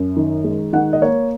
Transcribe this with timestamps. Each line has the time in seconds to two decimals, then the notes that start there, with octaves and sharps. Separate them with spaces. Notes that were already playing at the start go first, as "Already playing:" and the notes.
Already playing: F#2
0.17 D#3
0.44 G#3
0.73 D#3 F#5
0.93 D#5
1.02 A#3 C#5